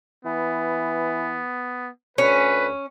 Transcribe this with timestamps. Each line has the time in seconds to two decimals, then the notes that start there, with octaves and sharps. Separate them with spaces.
0.25 E3 B3
2.18 D2 C#4 B4